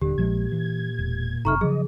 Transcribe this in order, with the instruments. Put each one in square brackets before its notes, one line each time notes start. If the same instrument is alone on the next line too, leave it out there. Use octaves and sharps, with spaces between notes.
[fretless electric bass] D#1 D3 [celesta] G4
[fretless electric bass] A#1 F3 G#3 [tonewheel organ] A#2 G#6
[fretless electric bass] E3
E1
[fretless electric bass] F#1 C3 [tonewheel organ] D#4 A4 E5 [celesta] A#5 C#6 F6
[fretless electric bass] C#3 F3 F#3 [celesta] G#4 [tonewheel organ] D#5